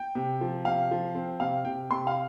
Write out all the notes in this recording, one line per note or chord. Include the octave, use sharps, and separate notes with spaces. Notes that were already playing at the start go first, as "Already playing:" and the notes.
Already playing: G5
C3
F3
C3 F5
F3
C4
C3 F5
C3 G5
C3 C6
F5